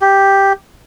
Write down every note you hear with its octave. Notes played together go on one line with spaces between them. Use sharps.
G4